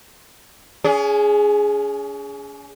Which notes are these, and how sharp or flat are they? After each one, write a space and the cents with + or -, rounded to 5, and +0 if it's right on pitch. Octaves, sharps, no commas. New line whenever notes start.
C#4 +40 G#4 +0